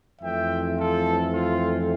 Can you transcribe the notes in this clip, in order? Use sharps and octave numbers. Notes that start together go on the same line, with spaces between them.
F2 E3 A3 C4 E5 G5
F4 A4
F4